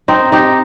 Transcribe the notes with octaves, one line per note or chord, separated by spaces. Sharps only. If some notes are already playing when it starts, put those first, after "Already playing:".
C4 D#4
D#4 G4